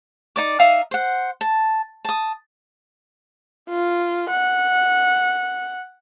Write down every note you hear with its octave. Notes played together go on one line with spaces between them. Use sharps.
D#4 D5 D6
D#4 E5 F5 D#6
C5 F#5
A5
A5 D#6
F4
F#5